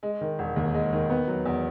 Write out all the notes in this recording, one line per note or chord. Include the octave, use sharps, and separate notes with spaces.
G#3
D#3
E1
D#2
G#3
D#3
B3
F#3
E2